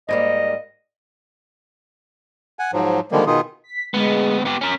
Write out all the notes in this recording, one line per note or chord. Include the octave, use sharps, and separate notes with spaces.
G#2 G3 A#3 D#5
F#5 G#5
G#2 F3 F#3
D3 D#3 F3 G3 G#3 A#3
B2 D#3 D#4 F4 G#4
B6
D2 G#3 B3
B3 G4
C#4 A#4 B6